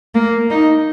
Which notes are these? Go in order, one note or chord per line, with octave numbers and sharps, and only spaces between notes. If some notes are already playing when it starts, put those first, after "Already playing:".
A#3
D#4